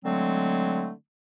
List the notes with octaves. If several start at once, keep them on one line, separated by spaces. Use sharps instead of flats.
D3 F#3 G#3 A3 C4